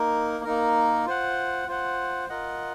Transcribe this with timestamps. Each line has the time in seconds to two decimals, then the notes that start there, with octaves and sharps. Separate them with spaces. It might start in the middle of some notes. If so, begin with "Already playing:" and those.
Already playing: A#3 D#4 A#4
0.45 A#3 D#4 A#4
1.06 F4 C5 F#5
1.68 F4 C5 F#5
2.29 F4 A#4 D#5 F#5